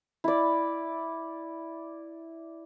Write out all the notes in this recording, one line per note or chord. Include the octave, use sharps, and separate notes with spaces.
E4 D5